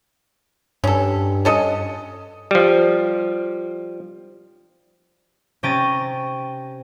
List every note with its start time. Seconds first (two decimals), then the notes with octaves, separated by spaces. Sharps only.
0.84 G2 C#4 A4
1.45 C#4 A4 D#5
2.51 F3 G3
5.63 C3 C#4 G5 A#5 A6 D#7